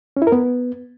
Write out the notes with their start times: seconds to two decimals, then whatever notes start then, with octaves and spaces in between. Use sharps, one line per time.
0.17 C#4
0.22 E4
0.27 A#4
0.32 B3